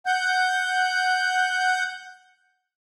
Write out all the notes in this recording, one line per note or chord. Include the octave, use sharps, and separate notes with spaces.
F#5 G6